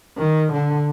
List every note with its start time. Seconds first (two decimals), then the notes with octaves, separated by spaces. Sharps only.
0.18 D#3
0.52 D3